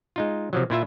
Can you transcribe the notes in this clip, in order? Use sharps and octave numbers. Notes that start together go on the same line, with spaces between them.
G#3 D#4 F4
C3 F3 F#3
A#2 E4 F4 E5